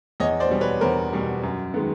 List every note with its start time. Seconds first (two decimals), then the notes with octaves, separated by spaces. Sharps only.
0.20 E2 C#5 D#5
0.40 C5 D5
0.50 B2 G3
0.61 B4 C#5
0.81 E2 A#4 C5
1.13 B2 G3
1.43 F#2
1.74 D#3 G#3 B3